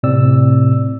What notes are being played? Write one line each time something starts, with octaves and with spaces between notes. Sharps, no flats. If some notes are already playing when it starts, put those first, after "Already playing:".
A2 C3 C4 D5 E6